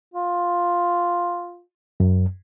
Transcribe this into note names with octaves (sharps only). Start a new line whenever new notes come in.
F4
F#2